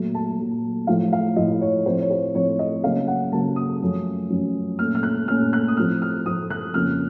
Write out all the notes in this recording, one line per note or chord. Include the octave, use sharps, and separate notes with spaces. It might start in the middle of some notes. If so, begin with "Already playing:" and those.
Already playing: A#2 F#3 A3
A5
A#2 F#3 A3
A2 F3 A3 F5
F5
A2 F3 A3 D#5
C#5
A2 F3 A3 C4 C5
C#5
C5
A2 F3 A3 C4 C#5
D#5
C#3 F#3 A#3 C#4 F5
F#5
C#3 F#3 A#3 C#4 A5
D#6
F#2 F3 A3 C#4
F#2 F3 A3 C#4
A#2 A3 C#4 F6
F6
F#6
A#2 A3 C#4 F6
F#6
D#6
A2 F3 C4 F6
F6
A2 F3 C4 D#6
F#6
F2 C#3 F3 A#3 C#4 F6